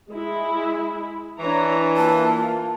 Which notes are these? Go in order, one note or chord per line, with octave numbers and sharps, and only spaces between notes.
G#3 E4
E3 D4 C#5 A#5
A#3 F4 A5